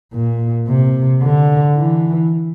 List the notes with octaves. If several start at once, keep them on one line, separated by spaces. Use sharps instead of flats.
A#2
C3
D3
E3